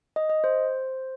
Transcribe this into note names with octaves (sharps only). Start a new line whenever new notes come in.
D#5
D#5
C5